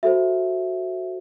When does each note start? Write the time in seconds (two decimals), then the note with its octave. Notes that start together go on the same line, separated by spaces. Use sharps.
0.03 F#4 A4 C5 E5